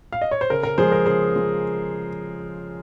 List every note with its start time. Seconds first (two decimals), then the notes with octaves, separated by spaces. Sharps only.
0.13 F5
0.21 D#5
0.31 C#5
0.41 C5
0.50 C#3 A#4
0.63 A#4
0.78 F3 G#3 G#4 C5
0.92 A#4
1.06 C#3 G#4 C5
1.34 F3 G#3